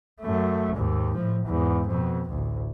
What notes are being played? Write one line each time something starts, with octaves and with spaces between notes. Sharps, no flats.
F#2 A3
D#2 G#2
A2 F3
E2 G#2
F2 B2
A1 D2